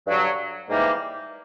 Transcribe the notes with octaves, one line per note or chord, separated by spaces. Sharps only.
G2 D3 F#3
G#2 E3 G3 A#3